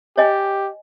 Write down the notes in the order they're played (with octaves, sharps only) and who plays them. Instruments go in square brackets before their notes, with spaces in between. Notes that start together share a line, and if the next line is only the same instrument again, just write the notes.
[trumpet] G4 [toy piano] C#5 D#5 G#5